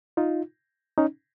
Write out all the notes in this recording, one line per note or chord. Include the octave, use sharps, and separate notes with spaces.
D#4 F4
C#4 D#4